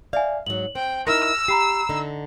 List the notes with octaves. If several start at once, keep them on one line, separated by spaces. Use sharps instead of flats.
D5 E5 F5 G#5
G#2 F#3 F#7
C4 G5
D#4 E4 A#4 E6 F6 A#6
G4 A#5 B5 C7
D3 D#4